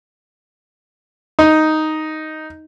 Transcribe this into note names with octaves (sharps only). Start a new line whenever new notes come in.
D#4